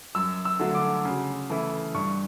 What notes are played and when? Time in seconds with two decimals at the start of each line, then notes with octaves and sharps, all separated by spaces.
0.15 F#2 E6
0.45 E6
0.60 D3 F#3 A3
0.74 D6
1.05 C#3
1.50 E3 A3 E4
1.94 G2 C#6